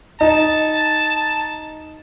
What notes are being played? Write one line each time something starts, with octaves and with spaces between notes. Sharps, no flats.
D#4 A5